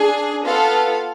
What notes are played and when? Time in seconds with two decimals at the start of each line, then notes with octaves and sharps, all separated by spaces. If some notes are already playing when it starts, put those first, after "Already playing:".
Already playing: D4 G#4
0.46 B3 F4 A4 F5